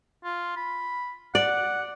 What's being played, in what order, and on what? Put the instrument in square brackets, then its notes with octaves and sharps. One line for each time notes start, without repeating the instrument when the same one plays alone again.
[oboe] F4
B5
[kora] D5 [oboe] F#5